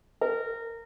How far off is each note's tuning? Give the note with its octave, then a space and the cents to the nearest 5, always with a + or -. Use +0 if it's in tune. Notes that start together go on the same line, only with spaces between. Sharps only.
A#4 -20